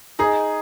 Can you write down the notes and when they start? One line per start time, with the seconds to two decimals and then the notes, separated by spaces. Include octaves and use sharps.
0.19 D#4 G#4 D#5